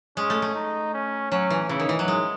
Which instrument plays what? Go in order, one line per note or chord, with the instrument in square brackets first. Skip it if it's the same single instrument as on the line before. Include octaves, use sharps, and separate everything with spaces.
[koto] G#3 [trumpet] C#4
[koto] A3
A3
[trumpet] D#4
C#4
[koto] F#3 [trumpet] C#4
[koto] E3
[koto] C#3 [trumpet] E4
[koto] D#3
E3
F#3
G#3